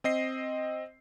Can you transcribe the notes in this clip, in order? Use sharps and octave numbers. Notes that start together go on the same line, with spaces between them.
C4 D#5 C7